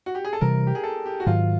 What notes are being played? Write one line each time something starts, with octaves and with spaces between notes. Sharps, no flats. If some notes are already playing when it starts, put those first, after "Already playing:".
F#4
G4
G#4
A4
C3 E3 G3 A#4
G4
G#4
A4
G4
F#4
G#2 D#3 F#3 F4